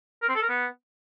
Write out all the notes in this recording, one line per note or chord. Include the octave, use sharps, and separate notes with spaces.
A#4
C4
A4
A#4
B3